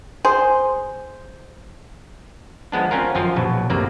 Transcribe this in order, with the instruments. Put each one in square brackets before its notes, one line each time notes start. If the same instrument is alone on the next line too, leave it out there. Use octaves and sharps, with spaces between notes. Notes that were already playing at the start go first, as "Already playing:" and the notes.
[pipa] G#4 C5
[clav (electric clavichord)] F3 G#3 B3 D4
C4 C#4 F4 A#4
F#2 F3 F4
A#1 B2 F#3
G1 D2 C3 A#3 D5